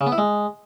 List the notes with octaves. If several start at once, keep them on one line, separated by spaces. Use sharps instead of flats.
C#3
B3
E4
G#3